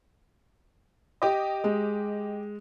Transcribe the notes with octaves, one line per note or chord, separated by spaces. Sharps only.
G4 D#5
G#3